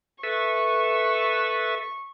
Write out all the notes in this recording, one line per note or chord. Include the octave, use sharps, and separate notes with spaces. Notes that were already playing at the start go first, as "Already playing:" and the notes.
A4 B4 E5 C#6